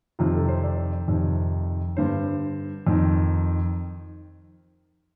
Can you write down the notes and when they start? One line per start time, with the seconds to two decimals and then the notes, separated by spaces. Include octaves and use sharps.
0.19 F2 C3 D#3 F4
0.34 A4
0.49 C5
0.63 D5
1.08 F2 C3 D#3
1.97 G2 D3 C5
2.87 F2 D#3